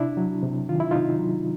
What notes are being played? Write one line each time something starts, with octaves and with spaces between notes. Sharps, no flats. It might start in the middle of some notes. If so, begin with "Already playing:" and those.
Already playing: C3 D4 E4
F#3
C3
D#3 F4
E4
C3 D#4 F4
F#3